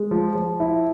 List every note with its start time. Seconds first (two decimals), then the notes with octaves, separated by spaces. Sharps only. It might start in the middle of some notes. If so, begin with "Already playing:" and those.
Already playing: G#3
0.11 F3
0.35 F3
0.60 E4